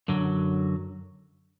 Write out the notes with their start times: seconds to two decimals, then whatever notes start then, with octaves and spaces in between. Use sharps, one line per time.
0.08 F#2 D3 F#3